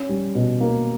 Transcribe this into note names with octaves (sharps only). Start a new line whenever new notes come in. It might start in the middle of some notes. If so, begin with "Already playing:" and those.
Already playing: C#4
G3
B2
A#3